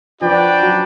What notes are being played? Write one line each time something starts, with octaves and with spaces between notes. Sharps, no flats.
F3 D4 F#4 B4 D5 G5
F#3